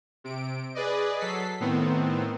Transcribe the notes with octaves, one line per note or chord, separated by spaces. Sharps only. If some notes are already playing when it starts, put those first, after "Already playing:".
C3 D7
G#4 B4 D5 D#5
F#3 A4 B6 C7
A2 D#3 B3 C4